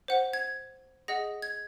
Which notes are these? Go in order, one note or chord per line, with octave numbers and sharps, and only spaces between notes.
C5 F#5
G#6
G#4 D#5 F#5 A#6
G#6